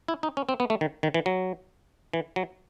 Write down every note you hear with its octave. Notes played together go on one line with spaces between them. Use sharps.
E4
D#4
C#4
C4
B3
A3
D#3
D#3
E3
F#3
E3
F#3